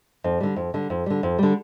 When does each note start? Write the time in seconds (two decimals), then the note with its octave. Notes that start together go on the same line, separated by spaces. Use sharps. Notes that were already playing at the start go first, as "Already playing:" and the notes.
0.24 F2
0.40 D3 G3
0.56 F2
0.74 D3 G3
0.90 F2
1.06 D3 G3
1.23 F2
1.39 D3 G3